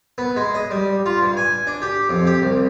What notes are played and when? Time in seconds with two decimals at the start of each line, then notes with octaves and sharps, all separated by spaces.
0.18 B3
0.36 G#3
0.54 D#5
0.71 G3
1.06 F4
1.21 G2
1.37 G#5
1.67 D4
1.82 G4
2.09 F2
2.27 G4
2.42 C2